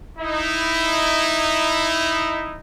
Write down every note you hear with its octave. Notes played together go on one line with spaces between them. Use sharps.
D#4 E4